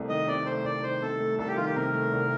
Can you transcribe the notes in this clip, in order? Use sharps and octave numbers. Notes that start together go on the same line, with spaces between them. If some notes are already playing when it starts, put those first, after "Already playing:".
Already playing: C2 C3 A3
D#3 D#5
C3 D5
A3 C5
C2 D5
D#3 C5
C3 A4
A3
C2 A4
G4
D#3 F4
G4
C3 A#4
A3
C2